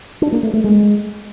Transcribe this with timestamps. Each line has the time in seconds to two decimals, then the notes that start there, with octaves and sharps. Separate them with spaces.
0.22 D4
0.32 A#3
0.43 A3
0.53 A3
0.64 G#3